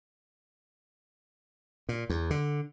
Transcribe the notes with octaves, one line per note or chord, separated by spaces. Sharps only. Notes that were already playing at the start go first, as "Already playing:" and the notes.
A#2
E2
D3